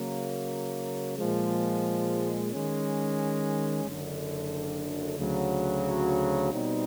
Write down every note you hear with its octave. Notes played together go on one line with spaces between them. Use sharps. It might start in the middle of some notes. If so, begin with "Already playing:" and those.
Already playing: C#3 F#3 A#3
A#2 F3 G#3
D#3 G#3 C#4
F#1 F#2 D3
D2 C#3 F#3
B2 G3 C4 D#4